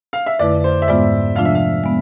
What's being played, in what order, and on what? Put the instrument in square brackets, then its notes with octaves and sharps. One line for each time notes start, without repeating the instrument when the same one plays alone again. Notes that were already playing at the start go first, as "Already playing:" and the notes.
[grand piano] F5
E5
[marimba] F2 D3 A3 E4 B4 [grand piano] D5
[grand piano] C5
E5
[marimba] G#2 G#3 B3 F4 [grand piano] D5
[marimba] C3 F3 A3 D4 F4 [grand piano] F5
[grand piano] E5
F5
[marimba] G#3 B3